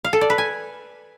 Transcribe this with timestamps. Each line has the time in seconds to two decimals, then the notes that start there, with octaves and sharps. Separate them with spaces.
0.04 F5
0.13 A4
0.21 D5
0.30 B4
0.38 G#5